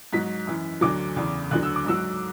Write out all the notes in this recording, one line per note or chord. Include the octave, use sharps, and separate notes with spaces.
G#2 F#3 B6
F#2 E3
D2 D3 F#3 D6
E2 C#3 E3
D2 D3 F#3 F#6
E6
D6
G#2 F#3 E6